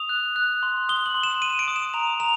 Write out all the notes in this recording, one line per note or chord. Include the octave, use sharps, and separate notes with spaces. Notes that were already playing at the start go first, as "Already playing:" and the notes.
Already playing: D#6 F7
F#6
F#6
C6
D#6 G7
F#7
C6
E7
C6 D#7
D7
D#6
E7
A#5 F7
A#5 F7